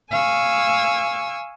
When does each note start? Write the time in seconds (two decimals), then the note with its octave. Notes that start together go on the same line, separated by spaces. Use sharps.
0.10 F5 G#5 C#6 E6